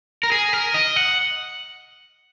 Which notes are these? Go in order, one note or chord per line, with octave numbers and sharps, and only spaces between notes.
A#4
G#4
A#4
D#5
F#5